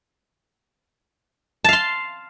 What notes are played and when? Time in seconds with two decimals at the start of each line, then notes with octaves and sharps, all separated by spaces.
1.64 A5
1.69 F5
1.73 C6